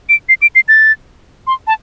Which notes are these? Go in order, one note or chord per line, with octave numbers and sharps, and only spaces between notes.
D7
C7
D7
C7
A6
C6
A5